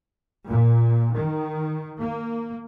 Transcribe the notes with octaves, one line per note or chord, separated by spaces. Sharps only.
A#2
D#3
A#3